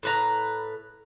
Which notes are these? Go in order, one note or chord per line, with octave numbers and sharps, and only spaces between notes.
A2 B4 A#5